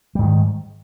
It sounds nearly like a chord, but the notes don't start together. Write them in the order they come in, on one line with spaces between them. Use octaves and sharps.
G3 G#2 D#3